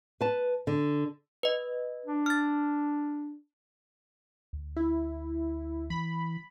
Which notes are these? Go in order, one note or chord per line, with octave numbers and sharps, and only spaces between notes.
B4 A5
D3
B4 D#5
D4
F6 A6
D2
E4
E3 B5